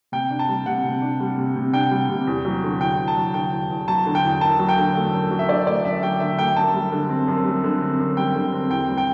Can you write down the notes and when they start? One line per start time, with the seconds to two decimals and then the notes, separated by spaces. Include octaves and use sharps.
0.12 C3 G5
0.31 D4
0.39 A5
0.49 G3
0.66 C3 F#5
0.84 C3
1.02 D4
1.20 G3
1.38 C3
1.56 C3
1.73 D4 G5
1.91 G3
2.09 C3
2.27 E2
2.45 F#3
2.63 D3
2.81 E2 G5
2.98 E2
3.08 A5
3.17 F#3
3.34 D3 G5
3.52 E2
3.70 E2
3.88 F#3 A5
4.06 D3
4.15 G5
4.24 E2
4.41 F#2 A5
4.59 F#3
4.69 G5
4.78 D3
4.95 A3
5.13 F#2
5.31 F#3
5.39 E5
5.49 D3 D5
5.67 A3 D5
5.85 F#2 E5
6.03 F#3 G5
6.20 D3 E5
6.39 A3 G5
6.56 F#2 A5
6.73 G3
6.92 D3
7.09 C4
7.28 F#2
7.45 G3
7.64 D3
7.81 C4
7.99 F#2
8.17 G3 G5
8.35 D3
8.53 C4
8.70 E2 G5
8.89 G3
8.97 G5